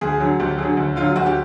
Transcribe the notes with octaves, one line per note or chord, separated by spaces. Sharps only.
D2 G#4
D3 F#3
D2 G4
D3 F#3 G#4
D2
D3 F#3 F4
D2 F#4
G4